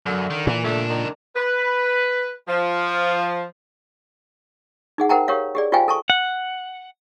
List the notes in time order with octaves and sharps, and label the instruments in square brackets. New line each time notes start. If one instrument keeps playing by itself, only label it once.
[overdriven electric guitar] F#2 [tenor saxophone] D3
[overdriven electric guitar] D#3
[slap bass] A#2 [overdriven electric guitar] E3
[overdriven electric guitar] C#2 D4 [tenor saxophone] A3
[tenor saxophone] D#3
[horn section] B4
F3
[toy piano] D#4 G#4 F#5
A#4 C5 F#5 G5 A5 A#5
G4 A#4 C#5 F5
G4 G#4 D5
F4 G4 C5 F5 G5 G#5
A4 A5 C#6
[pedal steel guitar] F#5